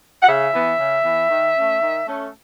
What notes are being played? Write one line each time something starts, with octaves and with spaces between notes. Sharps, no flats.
F#5
C#3 E5
E3 B3
C#3
E3 B3
D#3
A3 C#4
D#3
A3 C#4